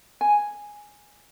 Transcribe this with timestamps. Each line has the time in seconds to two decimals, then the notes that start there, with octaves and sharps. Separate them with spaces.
0.21 G#5